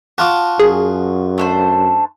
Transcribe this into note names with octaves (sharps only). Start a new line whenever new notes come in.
F4 F#4 A5 D6
F#2 G#4
A3 D4 C5